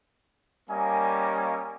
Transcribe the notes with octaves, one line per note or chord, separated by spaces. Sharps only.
G3 A#3 C#4 D#5 G#5